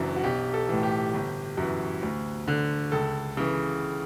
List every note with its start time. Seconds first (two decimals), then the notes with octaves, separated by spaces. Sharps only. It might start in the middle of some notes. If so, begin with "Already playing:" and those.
Already playing: F#1 F#2 E3 D4
0.16 F#4
0.23 B1 G4
0.54 A4
0.69 A2 E3
0.83 G4
1.14 G1
1.57 F#2 E3
2.02 D2
2.48 D3
2.92 C#2 A4
3.37 C#3 E3